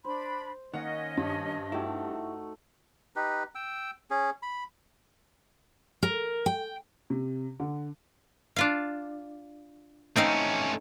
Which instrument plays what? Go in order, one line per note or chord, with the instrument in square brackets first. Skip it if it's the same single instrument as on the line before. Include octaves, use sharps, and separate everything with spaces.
[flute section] D4 B5 [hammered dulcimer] C5
[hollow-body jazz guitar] D#3 A#3 [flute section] C#4 D#5 [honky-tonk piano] F#5
[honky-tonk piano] G2
[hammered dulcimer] A3 D#4 F#4 [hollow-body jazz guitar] E4 G4
[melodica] D#4 G4 B4
G5 E6
C#4 G#4
B5
[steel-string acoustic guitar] A#4
G5
[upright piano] C3
D3
[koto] D4 F4 F5
[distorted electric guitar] A3 C#4 [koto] C4 D#4 F5